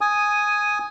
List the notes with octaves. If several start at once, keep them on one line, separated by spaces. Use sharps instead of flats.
G#5 D#6